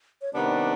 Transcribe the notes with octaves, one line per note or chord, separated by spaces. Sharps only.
C#5
C3 D#3 G3 B3 D4 D5